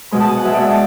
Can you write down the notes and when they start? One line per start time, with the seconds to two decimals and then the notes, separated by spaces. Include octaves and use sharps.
0.11 B2 G#3 B5
0.20 A5
0.29 G#5
0.37 F#5
0.45 B2 G#3 E5
0.54 D5
0.62 E5
0.70 A5